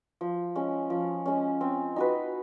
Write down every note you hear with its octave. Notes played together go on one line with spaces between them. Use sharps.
F3
G#3 C#4
F3
G#3 C#4
C4
D#4 F#4 B4